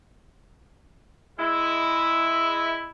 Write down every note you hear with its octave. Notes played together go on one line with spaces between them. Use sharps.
G#3 E4